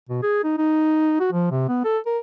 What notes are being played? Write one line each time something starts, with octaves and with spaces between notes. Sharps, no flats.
B2
G#4
D#4
D#4
F#4
F3
C3
B3
A4
A#4